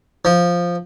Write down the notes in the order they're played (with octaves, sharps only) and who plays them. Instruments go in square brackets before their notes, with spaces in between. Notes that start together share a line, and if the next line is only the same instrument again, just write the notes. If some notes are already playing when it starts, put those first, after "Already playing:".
[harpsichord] F3